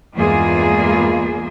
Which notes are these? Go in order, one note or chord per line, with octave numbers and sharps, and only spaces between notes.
E2 G2 G#3 A#3 F4 G#4